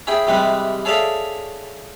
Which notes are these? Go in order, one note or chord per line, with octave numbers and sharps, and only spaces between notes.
C#4 E4 G#4 G5
C3 E3 G3 G#3 B4
G#4 A4 C#5 D5 E5 F5